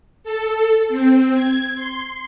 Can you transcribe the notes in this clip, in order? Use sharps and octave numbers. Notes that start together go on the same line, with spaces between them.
A4
C4
G#6
C6